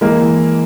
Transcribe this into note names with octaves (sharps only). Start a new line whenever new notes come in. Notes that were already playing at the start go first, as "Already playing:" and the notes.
E3 G#3 A#3
E3